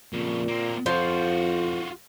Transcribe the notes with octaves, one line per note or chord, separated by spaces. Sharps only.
F2 A#2 C#3
A#3 C4
F2 F3 F4 F#4